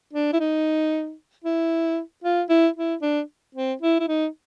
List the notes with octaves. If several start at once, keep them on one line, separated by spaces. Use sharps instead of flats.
D4
E4
D#4
E4
F4
E4
E4
D4
C4
E4
E4
D#4